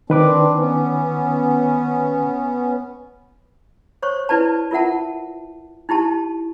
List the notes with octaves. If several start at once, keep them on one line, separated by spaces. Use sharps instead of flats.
D#3 C4 D4 B4 D6
B3 C#4
C5 C#5 C#6
E4 B4 D5 A5
F4 A#4 E5 F#5 A5
D#4 E4 G4 A5